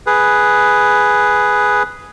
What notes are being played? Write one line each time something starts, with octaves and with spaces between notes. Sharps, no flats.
G#4 B4